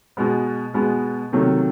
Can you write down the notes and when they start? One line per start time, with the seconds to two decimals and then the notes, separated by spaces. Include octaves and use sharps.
0.17 B2 G#3 B3
0.74 B2 G#3 B3
1.33 C3 D#3 F#3 A3